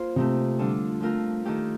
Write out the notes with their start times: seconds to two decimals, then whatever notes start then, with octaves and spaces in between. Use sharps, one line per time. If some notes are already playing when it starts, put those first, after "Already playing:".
Already playing: A#3 F4 A#4 C5
0.16 C3 A3 C4 D#4
0.59 D3 G3 D4 F4
1.01 F3 A3 C4 F4 A#4
1.45 D#3 A3 D#4 G4